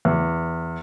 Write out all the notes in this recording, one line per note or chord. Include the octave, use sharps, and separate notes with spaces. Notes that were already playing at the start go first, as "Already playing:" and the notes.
E2